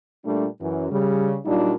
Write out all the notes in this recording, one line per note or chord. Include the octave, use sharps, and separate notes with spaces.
A#2 G3 A3 D4
F#2 E3
C#3 G3
A#2 F#3 G3 D4 D#4 F4